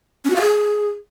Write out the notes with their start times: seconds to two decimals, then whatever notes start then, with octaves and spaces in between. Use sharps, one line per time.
0.25 C#4
0.30 F#4
0.36 F5
0.41 G#4